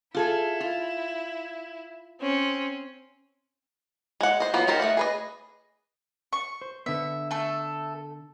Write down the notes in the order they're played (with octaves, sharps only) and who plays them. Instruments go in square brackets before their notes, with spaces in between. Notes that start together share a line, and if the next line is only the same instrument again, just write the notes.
[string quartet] E4 [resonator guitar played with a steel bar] F4 G#4 A4
[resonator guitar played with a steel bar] F4
[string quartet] C4 C#4
[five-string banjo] G#3 F#5
C5 D#5
F3 F#3 B3
D#4 G4 A4 A#4 C5
A3 A#3 D#5 F#5
G#4 B4 D#5
[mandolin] C#6
[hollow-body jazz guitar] C5
[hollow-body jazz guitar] D3 B3 [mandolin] E5
[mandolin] A3 A4